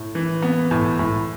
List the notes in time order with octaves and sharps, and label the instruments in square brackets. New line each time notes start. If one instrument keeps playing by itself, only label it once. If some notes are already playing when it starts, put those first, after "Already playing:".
Already playing: [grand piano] A2
E3
B3
A2
A2